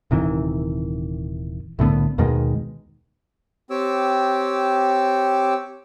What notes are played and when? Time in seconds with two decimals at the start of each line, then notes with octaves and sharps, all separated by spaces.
0.11 D#1 C3 D#3 E3
1.79 C2 A2 D3 B3
2.18 D#2 B2 D#3 G#3
3.70 C4 G4 C#5 D6 E6